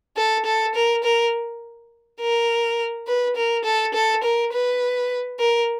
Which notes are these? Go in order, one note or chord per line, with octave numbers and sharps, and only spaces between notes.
A4
A4
A#4
A#4
A#4
B4
A#4
A4
A4
A#4
B4
A#4